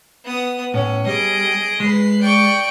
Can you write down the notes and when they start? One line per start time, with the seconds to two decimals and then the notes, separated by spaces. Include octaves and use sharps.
0.25 B3 D#6
0.74 A2 C#4
1.07 G3 G#4 D#5 D7
1.80 G#3 B4 C7
2.22 D5 G5 C#6 D7